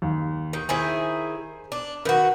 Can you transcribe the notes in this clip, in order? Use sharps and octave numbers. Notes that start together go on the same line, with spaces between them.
D#2
D#3
D#3 E4 G#4 C5 G#5
D4
D#3 F#4 A#4 B4